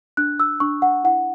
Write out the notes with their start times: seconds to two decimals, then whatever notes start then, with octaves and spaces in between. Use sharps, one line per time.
0.17 D4 F#6
0.40 E6
0.60 D4 C#6
0.82 F#5
1.04 E4 F#5